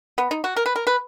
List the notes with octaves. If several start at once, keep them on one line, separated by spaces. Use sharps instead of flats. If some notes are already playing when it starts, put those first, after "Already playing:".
B3
D#4
F#4
A#4
B4
A#4
B4